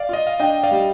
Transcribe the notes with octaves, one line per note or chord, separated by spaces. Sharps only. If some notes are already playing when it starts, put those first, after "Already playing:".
Already playing: D5 F5
F4 D#5
F5
D4 D#5 G5
D5 F5
G3